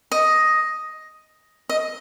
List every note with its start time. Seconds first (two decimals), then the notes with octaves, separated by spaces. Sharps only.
0.12 D#5
1.69 D#5